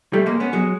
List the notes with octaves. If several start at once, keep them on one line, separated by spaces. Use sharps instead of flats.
G3 A3
G#3 A#3
B3 C#4
F#3 G#3